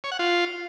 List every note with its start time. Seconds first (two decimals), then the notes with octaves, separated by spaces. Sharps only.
0.04 C#5
0.12 F#5
0.19 F4